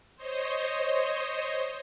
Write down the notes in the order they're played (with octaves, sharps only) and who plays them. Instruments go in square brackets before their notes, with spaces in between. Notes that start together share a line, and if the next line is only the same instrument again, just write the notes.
[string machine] C5 C#5 D#5